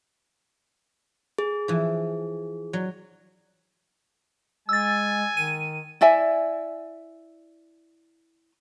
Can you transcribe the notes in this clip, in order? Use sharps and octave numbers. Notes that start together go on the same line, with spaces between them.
G#4
E3 F3
F#3
G#3 G#5 E6 A6
D#3 D#7
E4 D5 E5 G#5